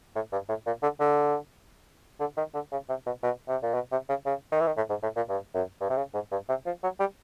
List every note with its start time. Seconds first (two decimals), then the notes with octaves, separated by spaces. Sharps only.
0.15 A2
0.32 G2
0.49 A2
0.67 A#2
0.83 D3
1.00 D3
2.20 D3
2.37 D#3
2.54 D3
2.72 C#3
2.89 C3
3.06 B2
3.23 B2
3.48 C3
3.63 A#2
3.74 B2
3.92 C3
4.09 C#3
4.26 C#3
4.51 D#3
4.60 E3
4.67 D#3
4.77 A2
4.90 G#2
5.03 A2
5.16 A#2
5.29 G2
5.54 F#2
5.80 G2
5.90 C3
5.97 C#3
6.14 G#2
6.31 G2
6.49 C3
6.66 F3
6.83 F#3
7.00 G3